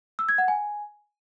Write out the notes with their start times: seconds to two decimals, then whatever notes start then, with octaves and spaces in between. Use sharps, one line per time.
0.19 E6
0.29 G#6
0.38 F#5
0.48 G#5